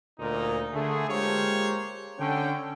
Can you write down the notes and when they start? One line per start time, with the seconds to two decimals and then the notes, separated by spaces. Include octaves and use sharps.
0.20 D2 A#2 D#4
0.73 D3 A3 G#4
1.09 G#3 A#3 F4 G4 C5 C#5
2.19 D3 C#4 G5